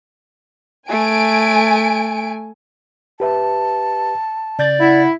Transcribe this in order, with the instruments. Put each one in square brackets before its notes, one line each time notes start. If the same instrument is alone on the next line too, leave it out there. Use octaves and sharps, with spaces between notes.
[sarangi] A3 [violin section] G#5 D7
[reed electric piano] G4 B4 E5 [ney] A5
[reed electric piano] C#3 G6 A6 [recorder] D5
[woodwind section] E4 [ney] F#5